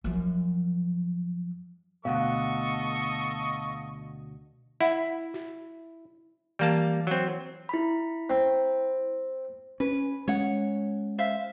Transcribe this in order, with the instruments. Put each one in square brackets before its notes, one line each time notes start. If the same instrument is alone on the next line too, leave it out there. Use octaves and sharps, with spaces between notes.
[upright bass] F#2 F3
[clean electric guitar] D2 G#2 B2 [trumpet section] A4 D#5 C#6 [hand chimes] F5 F#5
[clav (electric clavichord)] E4 [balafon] E5 F#5 B5
[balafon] F#4
[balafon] E3 [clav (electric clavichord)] G3 A#3 A5
[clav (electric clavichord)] F#3 C4
[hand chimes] E4 B5
[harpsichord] C4
[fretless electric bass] C#4 [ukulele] B4
[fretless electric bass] G#3 C#4 [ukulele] C#5 F#5
[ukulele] C5 E5 F5